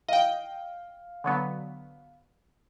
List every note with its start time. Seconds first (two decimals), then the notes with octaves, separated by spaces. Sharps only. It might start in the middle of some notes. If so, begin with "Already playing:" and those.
0.08 D#5 F5 G5
1.24 D3 F#3 B3